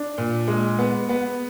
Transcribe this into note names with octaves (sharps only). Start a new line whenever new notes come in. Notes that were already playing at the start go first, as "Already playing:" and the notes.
Already playing: D4
A#2
G#3
B3
B3